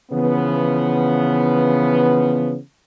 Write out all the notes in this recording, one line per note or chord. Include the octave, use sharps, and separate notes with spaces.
C#3 E3 F3 B3